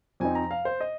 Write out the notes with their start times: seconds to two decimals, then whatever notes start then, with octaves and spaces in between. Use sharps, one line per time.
0.20 F2 F3 C4 D#4 G#5
0.35 A#5
0.51 F5
0.65 C5
0.81 D#5